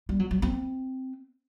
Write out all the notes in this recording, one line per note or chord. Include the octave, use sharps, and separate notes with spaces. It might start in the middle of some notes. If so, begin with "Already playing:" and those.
G3
F#3
F#3
C4